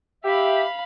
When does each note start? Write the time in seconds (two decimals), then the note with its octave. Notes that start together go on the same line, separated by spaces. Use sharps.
0.24 G4 E5 F5 B5